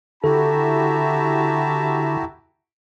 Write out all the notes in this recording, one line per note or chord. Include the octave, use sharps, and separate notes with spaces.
D3 E4 F#4 G4 A4 E5 A5 A#5